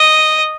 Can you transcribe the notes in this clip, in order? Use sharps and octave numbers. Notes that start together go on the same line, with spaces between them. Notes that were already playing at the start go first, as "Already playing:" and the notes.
Already playing: D#5